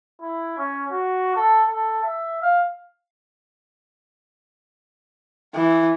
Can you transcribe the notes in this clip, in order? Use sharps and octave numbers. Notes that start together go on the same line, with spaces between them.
E4
C#4
F#4
A4
A4
E5
F5
E3